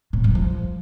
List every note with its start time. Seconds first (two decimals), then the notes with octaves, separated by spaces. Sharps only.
0.13 A2
0.24 G2
0.35 F3